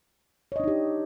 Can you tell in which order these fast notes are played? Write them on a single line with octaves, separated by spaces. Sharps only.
C#5 D#5 D4 D#4 G4